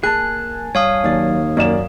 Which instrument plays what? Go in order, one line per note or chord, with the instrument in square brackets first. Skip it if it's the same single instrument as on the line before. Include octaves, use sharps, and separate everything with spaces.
[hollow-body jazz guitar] A#3 G#4 [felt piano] G#5 A5 [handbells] F#6
[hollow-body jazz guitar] G2 [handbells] C#5 F5 D#6
[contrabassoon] D#2 [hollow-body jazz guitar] F#3 D5
[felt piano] F#2 D5 E7 [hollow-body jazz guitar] A#3